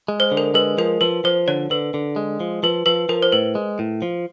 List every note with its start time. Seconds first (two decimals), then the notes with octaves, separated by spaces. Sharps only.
0.08 G#3
0.20 C5
0.32 D3
0.37 A#4
0.54 G#3 B4
0.78 F3 A#4
1.01 F3 B4
1.24 F3 C5
1.48 D3 C#5
1.70 D3 B4
1.94 D3
2.16 G#3
2.40 F3
2.63 F3 B4
2.86 F3 B4
3.09 F3 A#4
3.22 C5
3.32 A2 B4
3.55 G#3
3.79 A2
4.02 F3